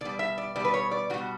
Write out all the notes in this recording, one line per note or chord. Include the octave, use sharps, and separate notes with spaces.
B2 G3 D5
E5
D5
B2 G3 D5
B4
C#5
D5
B2 G3 F#4